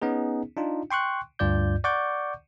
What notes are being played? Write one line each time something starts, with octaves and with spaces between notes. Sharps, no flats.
B3 C#4 D#4 G#4
D4 D#4 F4
G5 C6 C#6 F#6
D2 G2 F4 D5 G6
D5 F#5 C#6 D6 G6